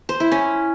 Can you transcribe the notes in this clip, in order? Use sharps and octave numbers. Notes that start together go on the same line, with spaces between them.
C5
E4
C#4